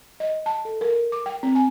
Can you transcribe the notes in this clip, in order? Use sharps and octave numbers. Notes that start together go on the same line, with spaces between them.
D#5
A5
A4
A#4
D6
G5
C4
G#5